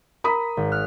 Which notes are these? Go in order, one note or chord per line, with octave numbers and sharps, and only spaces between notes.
A#4 A#5 B5 D#6 B6
G#1
F6 F#6